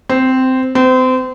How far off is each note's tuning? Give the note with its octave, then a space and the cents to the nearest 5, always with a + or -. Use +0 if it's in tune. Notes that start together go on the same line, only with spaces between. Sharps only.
C4 -10
C4 -30